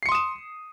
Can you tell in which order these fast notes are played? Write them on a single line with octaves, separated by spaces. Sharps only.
C7 C#7 C6 D#6 E7